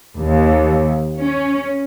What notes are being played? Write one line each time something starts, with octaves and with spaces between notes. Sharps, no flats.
D#2
C#4